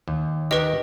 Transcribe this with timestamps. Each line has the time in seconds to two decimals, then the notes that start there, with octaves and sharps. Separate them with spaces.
0.08 D#2
0.51 D#3 G4 B4 D#5